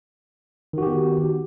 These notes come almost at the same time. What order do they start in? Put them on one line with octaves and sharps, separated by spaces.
D#3 F#4 G4 B3